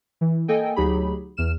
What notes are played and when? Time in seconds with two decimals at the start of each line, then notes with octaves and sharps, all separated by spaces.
0.21 E3
0.48 A#3 A4 D#5 G5 G#5
0.76 D2 F#3 D#4 G4 G#4 B5
1.37 E2 F6 E7